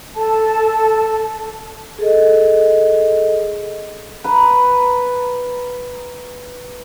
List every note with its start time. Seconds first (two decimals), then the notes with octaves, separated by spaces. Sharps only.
0.16 A4 A5
1.99 G#4 A4 D#5
4.24 B4 A#5